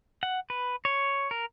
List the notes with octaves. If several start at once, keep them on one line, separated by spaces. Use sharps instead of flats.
F#5
B4
C#5
A#4